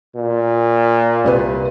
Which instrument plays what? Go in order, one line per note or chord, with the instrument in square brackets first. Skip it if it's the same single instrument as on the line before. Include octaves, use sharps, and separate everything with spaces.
[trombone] A#2
[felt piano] C2 C4 B4